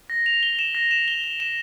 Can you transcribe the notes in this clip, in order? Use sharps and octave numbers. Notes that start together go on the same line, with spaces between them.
A#6
F7
G7
E7
A#6
E7
G7
G7
E7